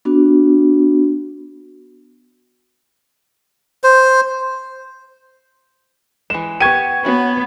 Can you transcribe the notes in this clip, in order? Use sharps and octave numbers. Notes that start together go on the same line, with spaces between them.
B3 D4 F#4
C5
E3 G#3 E7
B3 G4 C#6 G#6 D#7
B3 C#4 F#4